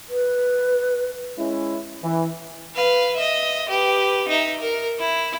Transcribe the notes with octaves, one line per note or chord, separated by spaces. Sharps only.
B4
G#3 C#4 E4
E3
B4 F5
D#5 E5
G4 B4
D#4 E5
A#4
E4